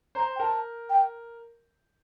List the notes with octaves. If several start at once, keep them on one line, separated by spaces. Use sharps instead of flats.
C5 A#5
G5
A#4 A5
G5